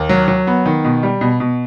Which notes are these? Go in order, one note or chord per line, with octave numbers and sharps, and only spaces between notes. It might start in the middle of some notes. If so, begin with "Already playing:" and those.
Already playing: D#2
F#3
F#3
B3
D#3
B2
G3
B2
B2